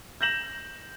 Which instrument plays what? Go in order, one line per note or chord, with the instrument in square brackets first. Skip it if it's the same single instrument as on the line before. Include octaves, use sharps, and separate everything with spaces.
[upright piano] G6 A#6 E7 F#7